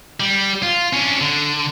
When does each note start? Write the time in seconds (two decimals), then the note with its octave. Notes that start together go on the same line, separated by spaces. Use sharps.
0.20 G3
0.63 F4
0.93 C#4 D4
1.21 D3